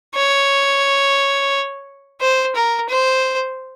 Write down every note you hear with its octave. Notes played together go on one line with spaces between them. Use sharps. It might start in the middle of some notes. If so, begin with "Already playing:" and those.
C#5
C5
A#4
C5